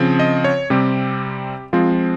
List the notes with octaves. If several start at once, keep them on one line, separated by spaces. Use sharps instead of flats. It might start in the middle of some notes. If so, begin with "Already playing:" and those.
Already playing: C#3 F3 C4
D#5
C#5
C3 G3 C4 G4
F3 G#3 C4 F4